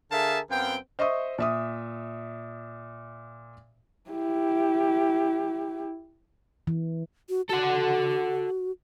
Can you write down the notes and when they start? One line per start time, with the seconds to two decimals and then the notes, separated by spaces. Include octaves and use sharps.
0.12 D3 G#4 A#4 E5 F5 A5
0.51 F#2 B3 C4 F5 G5
0.99 C5 D#5 E5 C#6 D#6
1.38 A#2 E5 D#6
4.10 E4 G4
6.67 E3
7.29 F#4
7.49 F#4 A4 F#5